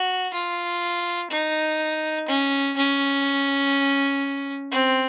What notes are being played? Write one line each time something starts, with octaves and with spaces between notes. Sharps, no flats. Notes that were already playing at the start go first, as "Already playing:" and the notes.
Already playing: F#4
F4
D#4
C#4
C#4
C4